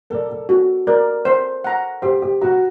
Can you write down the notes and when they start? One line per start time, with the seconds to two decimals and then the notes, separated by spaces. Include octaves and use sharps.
0.10 A4 A#4 D5
0.30 A4
0.49 F#4
0.87 A#4 D5
1.25 C5
1.64 F#5 A#5
2.02 G4 C5
2.22 G4
2.41 F#4 F#5 A#5